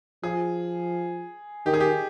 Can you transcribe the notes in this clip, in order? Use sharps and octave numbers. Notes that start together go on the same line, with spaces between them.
F3 G#4
D#3 G4
G#4
G4